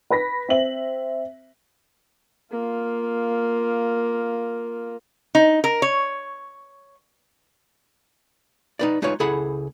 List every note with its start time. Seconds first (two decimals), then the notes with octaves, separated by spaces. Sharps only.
0.10 B4 B5 A#6 B6
0.48 C4 E5 F#7
2.51 A#3 F4
5.35 D#4
5.64 A#4
5.82 C#5
8.79 D#4 B4 D5
9.02 G#3 D#4 F4 B4 C#5
9.20 C#2 E4 G#4 A4 F#5 B5